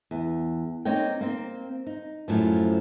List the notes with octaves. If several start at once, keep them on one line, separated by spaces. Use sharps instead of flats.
E2
A#3 C4 D#4 C#5 G5
A#3 C4
D#4
F#2 A2 F3